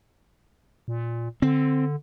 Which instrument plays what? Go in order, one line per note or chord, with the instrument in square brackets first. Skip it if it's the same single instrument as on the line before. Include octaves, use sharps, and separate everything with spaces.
[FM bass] A#2
[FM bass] D3 [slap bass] C4